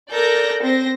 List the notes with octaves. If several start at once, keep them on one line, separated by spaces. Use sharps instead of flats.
A4 A#4 D5 G6 A#6
C4 C5 A#6